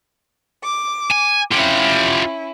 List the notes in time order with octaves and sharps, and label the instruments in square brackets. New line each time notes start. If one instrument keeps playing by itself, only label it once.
[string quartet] D6
[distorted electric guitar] G#5
[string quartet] C#4 E4 [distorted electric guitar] F4 G4